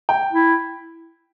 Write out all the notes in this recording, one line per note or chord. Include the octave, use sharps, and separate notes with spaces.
G5
E4